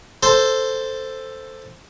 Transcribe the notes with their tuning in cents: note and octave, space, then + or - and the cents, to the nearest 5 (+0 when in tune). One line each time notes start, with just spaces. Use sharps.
A4 +5 C5 +0